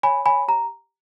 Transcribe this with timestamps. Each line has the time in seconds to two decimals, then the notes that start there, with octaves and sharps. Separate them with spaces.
0.03 C#5 G#5 B5
0.26 C#5 G#5 B5
0.48 G4 A#5